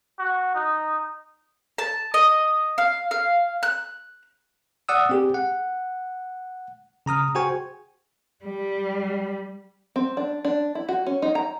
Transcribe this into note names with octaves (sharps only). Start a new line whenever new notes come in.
F#4
D#4
A5
D#5
F5
F5
F#6
D5 F#5 D#6 E6
C4 G4 G#4
F#5
C#3 A#5 D#6 F6
F#4 G#4 C5 G5 G#5 C#6
G3
C4
D4
D4
E4
F#4
C#4
D#4
A#5